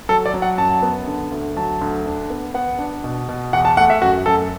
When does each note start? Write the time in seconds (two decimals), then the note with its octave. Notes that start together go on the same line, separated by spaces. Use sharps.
0.09 F#3 A4
0.26 D5
0.34 F#3
0.42 F#5
0.58 F#2 A5
0.82 B3
1.08 D3
1.32 D2
1.56 F#3 A5
1.81 D2
2.06 D4
2.30 B3
2.54 B3 F#5
2.79 D4
3.04 B2
3.29 B2
3.53 E2 F#5
3.65 A5
3.77 A3 F#5
3.90 E5
4.02 F#2 F#4
4.26 F#2 A4